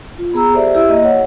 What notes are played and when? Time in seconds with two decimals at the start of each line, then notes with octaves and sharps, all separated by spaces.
0.18 F4
0.34 B3 G#4 A#5 E6
0.53 G4 A4 C5 D5 E5
0.74 E4 G4 E5 E6
0.89 A#3 D#5
1.04 C#5 F#5